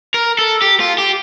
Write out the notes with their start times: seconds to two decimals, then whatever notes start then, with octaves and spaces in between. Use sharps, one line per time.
0.14 A#4
0.39 A4
0.62 G4
0.80 F4
0.98 G4